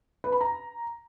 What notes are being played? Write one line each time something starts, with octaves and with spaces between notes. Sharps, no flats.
B4
B5
A#5